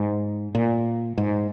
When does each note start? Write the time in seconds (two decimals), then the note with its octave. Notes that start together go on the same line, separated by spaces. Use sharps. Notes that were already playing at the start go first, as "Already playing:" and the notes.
Already playing: G#2
0.55 A#2
1.18 G#2